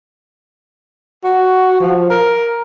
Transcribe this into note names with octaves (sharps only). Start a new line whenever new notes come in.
F#4
F3
A#4